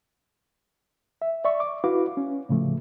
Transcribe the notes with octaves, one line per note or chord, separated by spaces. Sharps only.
E5
D5 E5 C#6
D6
E4 F#4 B4 F5 D6
C#4
A2 C#3 F3 A3